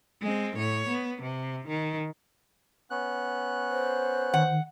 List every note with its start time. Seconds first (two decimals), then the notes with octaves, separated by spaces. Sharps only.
0.22 G#3 C4
0.57 A2 C#5
0.88 B3
1.22 C3
1.68 D#3
2.90 B3 C#4 F#6
3.70 C5
4.34 D#3 F#5